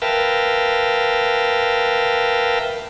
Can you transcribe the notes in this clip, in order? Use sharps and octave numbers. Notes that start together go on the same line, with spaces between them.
A#4 B4 E5 F5 G5 A5